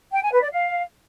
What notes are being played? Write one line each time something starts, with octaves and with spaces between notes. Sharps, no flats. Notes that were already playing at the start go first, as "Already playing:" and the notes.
G5
G#5
B4
D5
F5